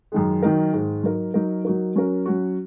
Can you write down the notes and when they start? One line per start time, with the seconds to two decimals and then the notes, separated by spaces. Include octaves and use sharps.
0.12 F#2 D#3 G#3
0.43 D#3 F#3 D#4 A#4
0.73 G#2 D#3 G#3
1.03 F#3 D#4 A#4
1.34 F#3 D#4 A#4
1.65 F#3 D#4 F#4 A#4
1.96 F#3 C#4 F#4 A#4
2.26 F#3 C#4 F#4